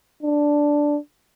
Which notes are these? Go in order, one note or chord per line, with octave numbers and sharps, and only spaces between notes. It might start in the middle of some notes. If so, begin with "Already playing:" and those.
D4